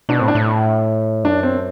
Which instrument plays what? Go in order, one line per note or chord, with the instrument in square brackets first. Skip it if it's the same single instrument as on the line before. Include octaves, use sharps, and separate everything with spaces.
[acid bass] B2 [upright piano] D4
[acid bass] A2 [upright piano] C4
[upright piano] D4
[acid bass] A2
[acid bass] F#2 [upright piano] D4
[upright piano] C4